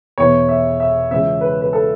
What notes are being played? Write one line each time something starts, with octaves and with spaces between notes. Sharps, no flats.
E2 B2 B3 E4 C#5
E5
E5
C#2 C#3 E3 C#4 E5
B4
B4
A4